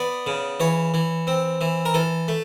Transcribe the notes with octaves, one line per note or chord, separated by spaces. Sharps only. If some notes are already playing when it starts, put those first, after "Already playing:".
Already playing: B3 D5
C#3
E3 C#5
E3
C4
E3
A#4
E3 A4
A3